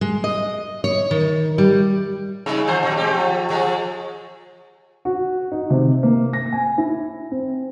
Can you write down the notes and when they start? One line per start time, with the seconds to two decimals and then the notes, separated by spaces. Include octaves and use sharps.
0.01 G#3
0.24 D#5
0.84 C#5
1.11 D#3
1.58 G3
2.46 C#3 G#3 D#4
2.67 D#3 F3 C5
2.83 A#2 F#3
2.97 G#3 C4 G4
3.14 F3
3.50 F3 G#3 G#4
5.05 F#4
5.52 D#4
5.70 C3
6.03 A#3
6.33 A#6
6.52 G#5
6.78 E4
7.31 C4